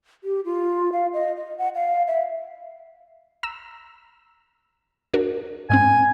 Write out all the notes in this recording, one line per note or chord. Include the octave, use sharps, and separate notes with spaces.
G4
F4
F5
D#5
D#5
F#5
F5
E5
A#5 E6
D4 F#4 A#4
G#2 G#3 C4 G#5